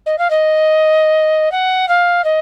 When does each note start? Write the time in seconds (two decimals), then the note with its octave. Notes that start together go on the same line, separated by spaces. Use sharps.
0.06 D#5
0.18 F5
0.30 D#5
1.51 F#5
1.88 F5
2.24 D#5